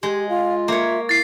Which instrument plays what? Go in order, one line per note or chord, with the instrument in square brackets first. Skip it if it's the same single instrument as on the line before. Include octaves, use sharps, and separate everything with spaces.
[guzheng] G#3 [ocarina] G4
[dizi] F4 [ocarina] F5
[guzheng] A#3 C#5 [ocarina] E5
[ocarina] E4 [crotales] A6 C7